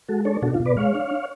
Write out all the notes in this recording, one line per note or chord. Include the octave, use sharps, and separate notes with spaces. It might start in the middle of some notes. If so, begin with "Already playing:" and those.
G#3 F#4 A4
D4 A4 C#5
B2 F#4 A4
F4
B2
B4 D5
G#3 C#5 F5
D4